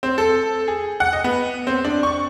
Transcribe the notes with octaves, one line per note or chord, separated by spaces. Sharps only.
C4
A4
G#4
F#5
D#5
B3
C4
D4
C#6